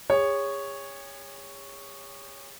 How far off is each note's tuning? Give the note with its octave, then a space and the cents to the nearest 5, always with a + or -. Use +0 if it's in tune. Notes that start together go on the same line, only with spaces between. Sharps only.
G#4 -40 C#5 +0